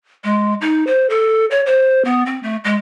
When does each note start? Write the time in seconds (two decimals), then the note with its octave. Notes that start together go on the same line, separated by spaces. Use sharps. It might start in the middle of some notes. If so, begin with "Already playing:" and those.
0.24 G#3
0.61 D#4
0.87 C5
1.10 A4
1.51 C#5
1.66 C5
2.05 B3
2.26 C4
2.43 A3
2.64 G#3